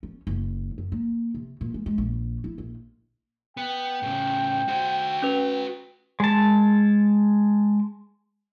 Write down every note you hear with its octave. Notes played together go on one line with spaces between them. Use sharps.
C#4
F#1
F#2
A#3
C3
A#2
G#3
G#3
A#1
E4
A#1
B3 G5
A2 C#3
F#4 C5
C#4 B4
G#3 A5